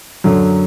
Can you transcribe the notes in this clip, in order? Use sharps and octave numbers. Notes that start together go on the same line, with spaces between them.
F#2 D3 F#3